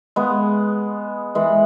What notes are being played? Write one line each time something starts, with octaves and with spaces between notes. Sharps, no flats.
G#3 B3
E3 G#3